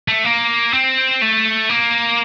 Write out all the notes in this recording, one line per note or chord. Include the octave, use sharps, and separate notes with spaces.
A3
A#3
C4
A3
A#3